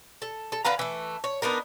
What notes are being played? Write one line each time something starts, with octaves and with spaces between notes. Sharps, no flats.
A4
A4
D3 B4 F5 A#5
E3 A3
C#5
B3 D4 D#4 A#4